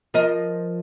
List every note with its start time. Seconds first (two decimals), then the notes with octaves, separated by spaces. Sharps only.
0.14 F3 A#4 D#5